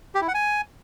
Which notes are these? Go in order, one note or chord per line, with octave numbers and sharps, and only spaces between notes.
G4
E4
F#5
G#5